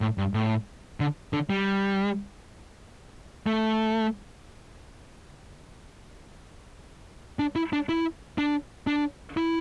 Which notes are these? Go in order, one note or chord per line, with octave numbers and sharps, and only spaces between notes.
A2
G2
A2
D3
D3
G3
A3
D4
E4
D4
E4
D4
D4
E4